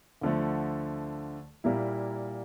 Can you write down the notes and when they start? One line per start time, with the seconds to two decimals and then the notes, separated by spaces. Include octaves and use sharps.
0.21 D2 D3 F3 A3
1.64 A#2 G3 A#3 E4